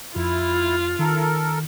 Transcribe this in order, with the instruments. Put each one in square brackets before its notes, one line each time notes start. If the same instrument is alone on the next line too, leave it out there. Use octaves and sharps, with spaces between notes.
[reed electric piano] F2 [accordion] E4 [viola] F4
[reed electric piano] D#3 [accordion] A4 A#4